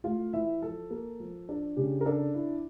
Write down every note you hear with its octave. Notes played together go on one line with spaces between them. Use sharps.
A3 F4 F5
E3 E4 E5
F3 A4
A#3
F3
D4
C#3 G4
A#4
D4 A4
E4